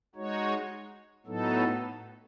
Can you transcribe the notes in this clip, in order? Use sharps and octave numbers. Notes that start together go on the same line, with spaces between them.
G#3 D#4 F#4 C#5
A2 F#3 B3 D#4 A4